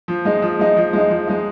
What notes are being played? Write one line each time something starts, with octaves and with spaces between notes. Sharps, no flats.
F3
G#3 D#4
F3
G#3 D#4
F3
G#3 D#4
F3
G#3 D#4